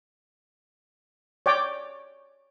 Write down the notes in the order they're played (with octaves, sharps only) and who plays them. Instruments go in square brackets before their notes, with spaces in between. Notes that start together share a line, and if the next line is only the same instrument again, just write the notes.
[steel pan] C#5 D5 G5 D6